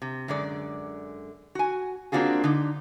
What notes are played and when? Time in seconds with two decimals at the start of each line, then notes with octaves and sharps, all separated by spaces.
0.02 C3
0.28 F#2 D3 G#3 D5
1.55 F#4 G#5
2.12 A#3 C4 D4 F4 F#4 G#4
2.44 D3 D#4